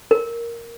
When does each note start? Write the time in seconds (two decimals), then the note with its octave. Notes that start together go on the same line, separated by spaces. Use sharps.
0.11 A#4